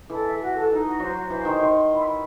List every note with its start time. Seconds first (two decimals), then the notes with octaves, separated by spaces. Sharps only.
0.10 E3 A4
0.25 E5
0.40 F#4
0.55 A4
0.69 D#4
0.85 F#4
1.00 F#3 C5
1.14 F#4
1.30 E3 C5
1.45 D#3 C6
1.60 D#3 C6
1.75 C6
1.90 E4
2.04 E4